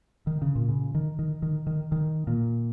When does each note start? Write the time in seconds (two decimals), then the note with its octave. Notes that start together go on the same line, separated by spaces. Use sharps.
0.27 D#3
0.42 C#3
0.55 A#2
0.69 C#3
0.94 D#3
1.19 D#3
1.42 D#3
1.67 D#3
1.92 D#3
2.27 A#2